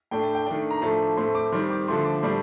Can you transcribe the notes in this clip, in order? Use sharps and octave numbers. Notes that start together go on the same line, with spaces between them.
A2 A3 D4 G5
A5
G5
D#3 A3 D4
A#5
A2 F3 A3 D4 A5
A2 A3 C4 C6
D6
D#3 G3 C4 C6
D6
D3 F3 A3 C6
D6
A2 G3 D4